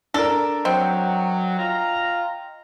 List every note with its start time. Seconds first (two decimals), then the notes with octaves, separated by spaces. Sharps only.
0.14 D4 A4 A#4
0.65 F#3 C4 D#5 G5
1.59 F4 A#5